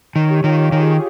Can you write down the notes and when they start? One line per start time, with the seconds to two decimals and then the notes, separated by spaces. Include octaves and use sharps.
0.16 D#3 C#5
0.30 G4
0.44 D#3 F4
0.58 G4
0.72 D#3 G#4